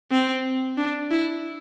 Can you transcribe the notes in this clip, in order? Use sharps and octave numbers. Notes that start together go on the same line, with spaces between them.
C4
D4
E4